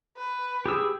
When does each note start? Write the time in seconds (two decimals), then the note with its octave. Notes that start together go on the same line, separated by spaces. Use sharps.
0.17 B4
0.66 G4 G#4 E6